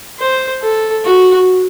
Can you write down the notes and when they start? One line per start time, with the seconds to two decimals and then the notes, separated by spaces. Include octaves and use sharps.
0.19 C5
0.62 A4
1.05 F#4